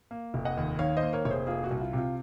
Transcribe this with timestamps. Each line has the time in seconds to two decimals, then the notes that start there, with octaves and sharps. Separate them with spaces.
0.11 A#3
0.34 F1
0.45 D#5 F#5
0.57 D#2
0.79 D#3 C#5 F5
0.97 C5 D#5
1.03 A#3
1.13 A#4 C#5
1.25 F1 C#5
1.30 G#4 C5
1.47 A#3 F4 G#4
1.59 F4
1.64 F#4
1.71 C2
1.81 F4
1.93 C3
1.98 F4